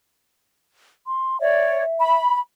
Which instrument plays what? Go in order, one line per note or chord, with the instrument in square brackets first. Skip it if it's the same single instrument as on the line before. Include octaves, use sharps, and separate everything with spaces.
[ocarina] C6
[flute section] C#5 D5 [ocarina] E5
[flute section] B5